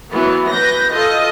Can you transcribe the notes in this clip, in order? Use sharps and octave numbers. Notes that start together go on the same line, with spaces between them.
E3 F#3 B3
B4 G6 A#6
F4 A4 D#5